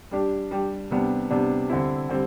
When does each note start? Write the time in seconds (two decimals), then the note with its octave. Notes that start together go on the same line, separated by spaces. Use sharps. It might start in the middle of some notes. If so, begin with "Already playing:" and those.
0.11 G3 D4 G4
0.51 G3 D4 G4
0.91 C3 G3 B3 D4
1.30 C3 G3 B3 D4
1.70 D3 G3 C4 E4
2.09 D3 G3 C4